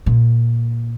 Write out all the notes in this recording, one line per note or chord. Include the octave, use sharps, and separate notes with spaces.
A#2